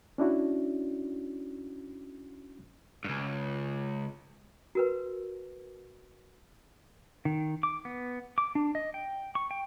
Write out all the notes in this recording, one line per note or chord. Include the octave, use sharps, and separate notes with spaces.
C#4 D4 E4 F#4
C#2 G2
F#4 A#4 B4
D#3
D6
B3
D6
D4
D#5
G5
C#6
G5